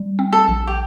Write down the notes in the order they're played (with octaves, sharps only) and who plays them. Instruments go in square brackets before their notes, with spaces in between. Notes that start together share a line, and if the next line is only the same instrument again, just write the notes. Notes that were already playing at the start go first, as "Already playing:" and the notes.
Already playing: [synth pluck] G3
C4
[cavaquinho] A4
[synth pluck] A#1
[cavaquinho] G4